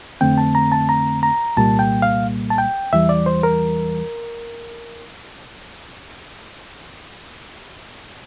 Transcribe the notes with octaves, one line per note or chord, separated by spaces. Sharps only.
F2 D3 A3 C4 G5
A5
A#5
A5
A#5
A#5
C2 A#2 G3 A#3 A5
G5
F5
A5
G5
E2 E3 G3 E5
D5
C5
A#4